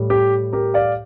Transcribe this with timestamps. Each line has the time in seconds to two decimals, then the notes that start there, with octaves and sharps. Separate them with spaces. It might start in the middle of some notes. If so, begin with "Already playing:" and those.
Already playing: A2 G3
0.10 G4
0.53 G4 A#4
0.74 D5 F5